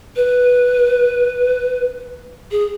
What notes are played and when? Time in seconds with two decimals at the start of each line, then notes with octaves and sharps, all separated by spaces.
0.16 B4
2.51 G#4